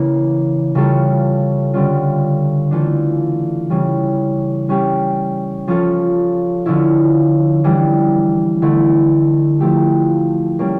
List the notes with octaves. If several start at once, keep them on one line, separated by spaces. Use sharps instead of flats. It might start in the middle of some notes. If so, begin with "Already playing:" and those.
Already playing: C#3 E3 A#3
C#3 G3 C#4 F4 A4
D3 G3 C#4 F4
E3 A3 D4 F4 A4
C#3 E3 G3 C#4
G3 C#4 G4
F3 C#4 F4 A4
D3 F3 C#4 E4
E3 G3 D4
D3 A3 E4
F3 A3 E4 G4
G3 A#3 C#4